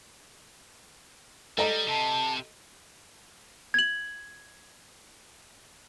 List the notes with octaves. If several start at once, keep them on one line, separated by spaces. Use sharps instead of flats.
G3 A4 D#5 A#5
C3 A5
G#6 F#7